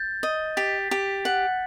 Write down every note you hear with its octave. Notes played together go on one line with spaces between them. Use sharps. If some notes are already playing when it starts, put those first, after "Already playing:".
Already playing: G6 A6
D#5
G4 A6 B6
G4
F#5